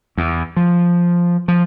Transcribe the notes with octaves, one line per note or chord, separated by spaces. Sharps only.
E2
F3
F3